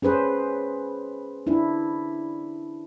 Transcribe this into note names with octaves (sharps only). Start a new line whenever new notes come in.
C#4 G#4 B4 C5
D4 E4